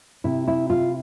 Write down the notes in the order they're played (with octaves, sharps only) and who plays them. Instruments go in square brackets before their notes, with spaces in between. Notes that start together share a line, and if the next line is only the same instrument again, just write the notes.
[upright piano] C3 [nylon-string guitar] E4
[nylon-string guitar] E4
[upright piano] C3 [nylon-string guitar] F4